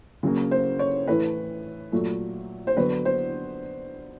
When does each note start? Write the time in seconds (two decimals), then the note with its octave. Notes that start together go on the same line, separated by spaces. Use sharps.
0.23 C#3 F#3 A#3
0.51 C5
0.79 C#5
1.08 A2 E3 A3 B4
1.92 A#2 F#3 A3
2.67 C5
2.77 D3 F#3 B3 B4
3.05 C5